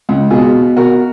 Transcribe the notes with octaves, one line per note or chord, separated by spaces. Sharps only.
C#2
B2 F4 G#4
B2
B2 F#4 A#4